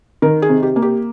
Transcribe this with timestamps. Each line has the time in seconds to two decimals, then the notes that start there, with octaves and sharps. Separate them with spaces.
0.22 D#3 A#4
0.42 G#4
0.49 C3
0.63 G4
0.76 A#3
0.82 G4